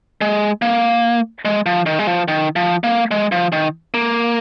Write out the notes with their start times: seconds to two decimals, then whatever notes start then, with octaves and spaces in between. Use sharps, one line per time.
0.21 G#3
0.62 A#3
1.45 G#3
1.66 F3
1.86 D#3
1.99 G#3
2.07 F3
2.28 D#3
2.56 F3
2.84 A#3
3.11 G#3
3.32 F3
3.52 D#3
3.94 A#3